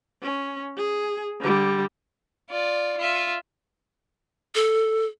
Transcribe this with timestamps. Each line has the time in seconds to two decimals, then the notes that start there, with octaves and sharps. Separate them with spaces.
0.22 C#4
0.77 G#4
1.41 D3 G3
2.50 F4 D5
2.98 F4 E5
4.55 A4